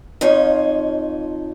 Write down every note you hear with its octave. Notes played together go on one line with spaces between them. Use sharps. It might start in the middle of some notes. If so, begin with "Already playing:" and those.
F2 F3 D#4 C#5